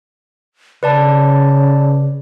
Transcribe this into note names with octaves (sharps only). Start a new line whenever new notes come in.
C#3 B4 D5 A5